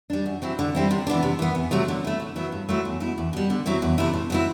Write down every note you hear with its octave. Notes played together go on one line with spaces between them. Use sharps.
G3 D4
F#2
F#3 C4 E4
D3
G3 C4 E4
C3
E3 B3 D4
C3
E3 B3
E2
C3 F#3 A3
D3
A3 E4
A2
F#3 B3 E4
G2
F#3 A3 C4 E4
E2
B2 A3 E4
E2
B2 G3
D3
F#3 C4 E4
E2
C3 E3 A3 E4
A2
F#3 C4 E4